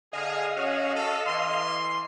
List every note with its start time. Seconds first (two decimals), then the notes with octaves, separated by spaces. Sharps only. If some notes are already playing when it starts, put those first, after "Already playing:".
0.13 D3 G#4 D#5 F5
0.56 C#4 F#4
0.96 A4
1.26 E3 C6